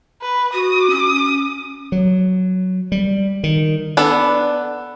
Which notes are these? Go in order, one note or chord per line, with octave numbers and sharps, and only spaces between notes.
B4
F#4 D#6
C#4
F#3
G3
D#3
B3 D4 A4